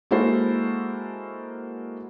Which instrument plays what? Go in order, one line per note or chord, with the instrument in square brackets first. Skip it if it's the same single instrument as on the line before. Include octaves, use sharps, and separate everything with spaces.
[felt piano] G#3 A#3 E4 F#4 A4 C5